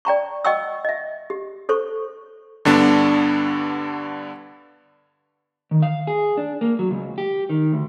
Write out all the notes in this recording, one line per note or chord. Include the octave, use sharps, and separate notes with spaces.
D5 G5 A#5 C#6
D#5 F#5 G5 C#6 E6
D#5 E5
G4
A4 C5 C#6
G2 D3 B3 D4
D#3
F5
G#4
D4
A#3
F#3
C#2
G4
D#3
D2